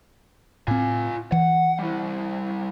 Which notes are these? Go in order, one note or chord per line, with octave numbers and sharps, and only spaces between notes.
A2 C4 F4 G#5
E3 F#5
G3 E4